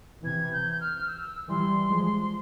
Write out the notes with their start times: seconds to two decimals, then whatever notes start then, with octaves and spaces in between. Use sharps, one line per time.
0.24 C3 E3 G#6
0.52 G6
0.70 G6
0.80 F6
1.07 E6
1.49 E3 G3 C6
1.90 F3 G#3